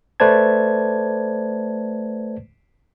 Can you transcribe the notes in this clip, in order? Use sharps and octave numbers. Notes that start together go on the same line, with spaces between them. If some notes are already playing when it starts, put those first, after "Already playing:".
A3 B4 C5 D5 A5 G#6